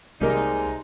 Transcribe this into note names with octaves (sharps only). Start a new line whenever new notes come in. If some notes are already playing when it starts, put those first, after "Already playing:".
C2 C3 G3 G#3 A#3 D#4 A#4